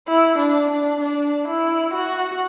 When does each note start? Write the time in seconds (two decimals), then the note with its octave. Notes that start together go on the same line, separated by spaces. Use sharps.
0.08 E4
0.39 D4
0.71 D4
1.01 D4
1.48 E4
1.94 F#4